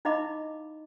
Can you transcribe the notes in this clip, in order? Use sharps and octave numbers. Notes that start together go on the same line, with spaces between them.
D#4 E4 D#5 F5 B5 D6